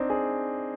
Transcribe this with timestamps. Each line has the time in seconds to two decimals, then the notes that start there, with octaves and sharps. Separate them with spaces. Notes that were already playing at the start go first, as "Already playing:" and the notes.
Already playing: C4 D4 D#4
0.10 G#4